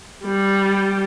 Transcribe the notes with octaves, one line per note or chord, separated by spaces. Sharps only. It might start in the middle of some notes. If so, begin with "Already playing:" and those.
G3